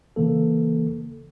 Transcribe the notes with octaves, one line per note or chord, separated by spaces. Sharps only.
C#3 E3 A#3 A4